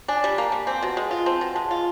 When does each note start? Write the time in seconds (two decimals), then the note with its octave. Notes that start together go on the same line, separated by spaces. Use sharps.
0.08 D4 G#5
0.24 G3
0.38 A#3 A5
0.52 G3
0.67 C4 G#5
0.83 B2
0.97 G#3
1.11 F4
1.26 C4 A5
1.41 B2
1.55 G#3 A5
1.71 F4